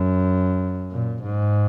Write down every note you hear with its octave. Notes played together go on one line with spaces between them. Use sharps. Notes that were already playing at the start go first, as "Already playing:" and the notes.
Already playing: F#2
A#2
G#2